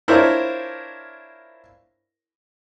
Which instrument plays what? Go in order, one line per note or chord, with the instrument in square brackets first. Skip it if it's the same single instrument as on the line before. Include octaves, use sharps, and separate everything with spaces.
[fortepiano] D4 E4 F4 A#4 C5 C#5